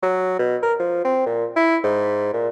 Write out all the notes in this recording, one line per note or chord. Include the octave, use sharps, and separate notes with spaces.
F#3
B2
A#4
F3
C4
A#2
E4
G#2
A#2